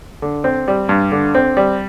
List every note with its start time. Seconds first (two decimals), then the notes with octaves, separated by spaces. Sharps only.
0.22 D3
0.44 C4
0.68 G3
0.89 G2
1.12 D3
1.35 C4
1.57 G3